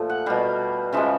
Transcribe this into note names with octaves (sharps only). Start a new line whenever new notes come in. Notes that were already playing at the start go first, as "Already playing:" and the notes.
Already playing: A#2 F3 A3
F#5
B2 G3 F5
C#3 F3 G#3 E5